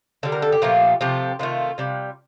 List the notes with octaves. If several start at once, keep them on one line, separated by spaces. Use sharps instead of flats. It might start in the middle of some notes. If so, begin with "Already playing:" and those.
D3 G3 A4
A#4
A4
G4
A#2 F3 A3
C3 F3 A3 G4
C3 D#3 A3 F4
C3 G3